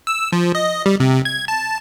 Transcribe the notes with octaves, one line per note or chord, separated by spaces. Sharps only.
E6
F3
D#5
G3
C3
G#6
A5